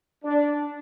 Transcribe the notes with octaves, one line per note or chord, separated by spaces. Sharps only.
D4